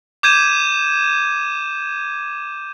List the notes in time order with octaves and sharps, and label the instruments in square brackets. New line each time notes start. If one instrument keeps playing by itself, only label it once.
[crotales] D6 G6 G#6 D#7 E7